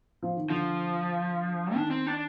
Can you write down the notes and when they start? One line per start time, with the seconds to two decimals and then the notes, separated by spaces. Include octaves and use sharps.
0.23 F3
0.37 D#3
0.49 D3 F3
1.75 D#3 D4
1.91 C4
2.07 D4